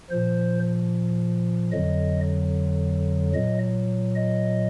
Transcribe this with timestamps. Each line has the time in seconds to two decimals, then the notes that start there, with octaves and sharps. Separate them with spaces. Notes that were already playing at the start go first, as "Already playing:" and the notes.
0.10 A#2 F3 C5
1.72 F2 D3 F#3 D#5
3.34 A#2 F#3 D#5
4.16 D#5